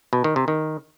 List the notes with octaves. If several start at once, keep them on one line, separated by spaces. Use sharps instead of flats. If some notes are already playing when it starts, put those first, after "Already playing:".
B2
D#3
C3
D#3